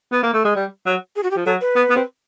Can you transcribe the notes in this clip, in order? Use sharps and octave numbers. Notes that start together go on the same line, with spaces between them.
B3
A#3
A3
G#3
G3
F#3
G#4
F#4
G4
F3
F#3 A4
B4
B3
B3
C4